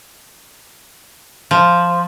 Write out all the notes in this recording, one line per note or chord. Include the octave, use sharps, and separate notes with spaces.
F3